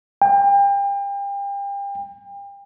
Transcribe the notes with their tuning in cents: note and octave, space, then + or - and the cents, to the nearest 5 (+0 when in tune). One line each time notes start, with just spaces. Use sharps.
G5 +35